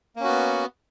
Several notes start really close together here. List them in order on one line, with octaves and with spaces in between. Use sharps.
A#3 C#4 F#4 B3